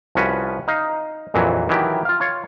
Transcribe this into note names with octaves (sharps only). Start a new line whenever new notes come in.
C2 F3 C#4 F#4 B4
D#4 F5
A#1 F2 A#2 E3 F#3
D#3 E3 F#3 E4 G4
F4 F5
F4 C#5